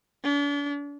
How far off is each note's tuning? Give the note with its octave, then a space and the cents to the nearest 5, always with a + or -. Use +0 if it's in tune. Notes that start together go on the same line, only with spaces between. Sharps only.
D4 -40